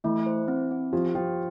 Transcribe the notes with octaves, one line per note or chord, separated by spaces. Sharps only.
E3 A3 E4
C5
C4
C4
F3 F4 G4
F3 F4 G5